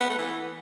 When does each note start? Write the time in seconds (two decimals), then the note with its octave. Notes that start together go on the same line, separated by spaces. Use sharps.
0.01 B3
0.09 A3
0.18 E3